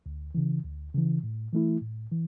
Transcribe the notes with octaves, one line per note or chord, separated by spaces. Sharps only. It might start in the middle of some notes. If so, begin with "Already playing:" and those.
D2
C#3 E3
D2
C#3 E3
A2
E3 A3 E4
A2
E3